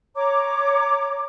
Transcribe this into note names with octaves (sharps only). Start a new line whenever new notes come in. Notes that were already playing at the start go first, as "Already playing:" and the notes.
C#5 A#5 D6